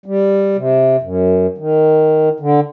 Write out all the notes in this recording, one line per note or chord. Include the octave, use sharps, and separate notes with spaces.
G3
C3
F#2
D#3
D3